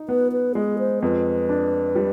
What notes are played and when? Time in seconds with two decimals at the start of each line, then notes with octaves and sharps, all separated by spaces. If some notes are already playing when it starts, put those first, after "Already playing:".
Already playing: D#4
0.09 B3 B4
0.32 B4
0.55 G#3 G#4
0.79 C5
1.02 F2 B4
1.49 D4
1.96 G3